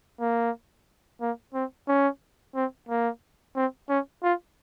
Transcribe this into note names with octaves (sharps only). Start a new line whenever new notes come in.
A#3
A#3
C4
C#4
C4
A#3
C4
C#4
F4